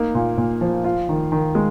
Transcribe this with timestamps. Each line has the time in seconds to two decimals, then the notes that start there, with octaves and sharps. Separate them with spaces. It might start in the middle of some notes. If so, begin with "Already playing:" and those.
Already playing: A#3 D#4
0.14 A#2
0.37 A#2
0.61 F3
0.84 F4
1.09 D#3
1.32 D#3
1.55 G#3